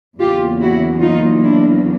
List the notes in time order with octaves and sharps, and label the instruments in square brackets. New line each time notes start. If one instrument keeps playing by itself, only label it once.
[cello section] E2 C#3 F#3 A#3 F4 G4
E4 F#4
D#4 F4
D4 E4